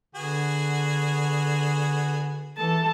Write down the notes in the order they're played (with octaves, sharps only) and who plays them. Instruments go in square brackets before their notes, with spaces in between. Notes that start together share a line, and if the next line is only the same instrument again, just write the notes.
[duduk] D3 [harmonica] B3 F#4 G#4
[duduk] E3 [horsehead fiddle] A4 A5